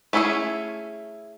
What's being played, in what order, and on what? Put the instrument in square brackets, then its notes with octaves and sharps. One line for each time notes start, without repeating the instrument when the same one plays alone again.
[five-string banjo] A3 C#4 E4 F#4 G#4